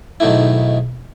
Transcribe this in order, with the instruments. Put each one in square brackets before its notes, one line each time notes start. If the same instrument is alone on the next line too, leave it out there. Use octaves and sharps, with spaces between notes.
[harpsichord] B1 G#2 D#3 A3 E4